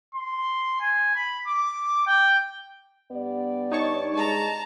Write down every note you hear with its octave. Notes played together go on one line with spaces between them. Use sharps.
C6
G#5
B5
D6
G5
G2 B3 G4 D5
D#4 C#5 A5 C#6
G#3 A5 A#5